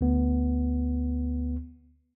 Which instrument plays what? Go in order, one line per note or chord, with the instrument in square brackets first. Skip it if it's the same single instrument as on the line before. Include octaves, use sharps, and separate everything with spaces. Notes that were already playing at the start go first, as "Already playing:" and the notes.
[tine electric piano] D2 B3